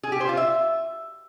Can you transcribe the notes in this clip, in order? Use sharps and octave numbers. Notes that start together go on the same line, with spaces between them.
G#4
G4
C5
F4
E5